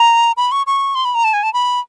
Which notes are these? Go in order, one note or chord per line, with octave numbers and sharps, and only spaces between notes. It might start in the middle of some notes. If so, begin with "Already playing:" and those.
Already playing: A#5
B5
C#6
C#6
C6
B5
A#5
A5
G#5
A5
B5